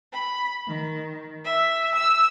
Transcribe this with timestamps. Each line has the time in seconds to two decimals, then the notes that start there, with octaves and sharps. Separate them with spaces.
0.11 B5
0.66 D#3
1.44 E5
1.94 E6